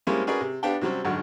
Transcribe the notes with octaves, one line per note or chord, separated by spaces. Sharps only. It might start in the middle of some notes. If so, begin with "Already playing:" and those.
G3 G#3 A#3 C4 C#4 E4
C#4 F#4 G#4 A#4 B4 D5
C3
B3 D4 G4 F5 G5 A5
C3 F#3 G3 C4 C#4
G#1 F#2 D3 F#4